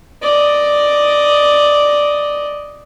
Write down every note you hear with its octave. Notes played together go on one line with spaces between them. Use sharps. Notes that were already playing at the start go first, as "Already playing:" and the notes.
D5 D#5